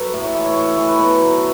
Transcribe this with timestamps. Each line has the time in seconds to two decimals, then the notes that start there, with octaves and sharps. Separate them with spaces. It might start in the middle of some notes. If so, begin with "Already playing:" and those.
Already playing: F#3 A4 B4
0.13 A2 E5
0.24 C#5
0.35 E3 E5
0.45 C#5
0.56 A2 C#5
0.67 E5
0.77 E3 C#5
0.88 B4
0.99 B2 A4
1.20 F#3